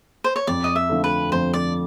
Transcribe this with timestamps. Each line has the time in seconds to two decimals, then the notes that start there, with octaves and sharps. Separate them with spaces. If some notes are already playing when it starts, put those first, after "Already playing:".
0.24 C5
0.36 C#5
0.47 F2 D5
0.64 D#5
0.76 E5
0.90 D3 F3 A3
1.04 B4
1.32 F2 C5
1.53 D5